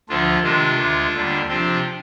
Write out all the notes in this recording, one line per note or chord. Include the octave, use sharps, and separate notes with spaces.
D2 D3 F3 D4 F4
C3 D#3 G#3 D4 F4
D2 D3 G#3
D#2 D3 G3 D4
C3 F3 C4 D4 F4